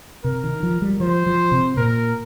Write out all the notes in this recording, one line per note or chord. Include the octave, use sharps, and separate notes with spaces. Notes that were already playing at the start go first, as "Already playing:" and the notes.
C3 A#4
D#3
F3
G3
F3 C5
F3
C3
A#2 A#4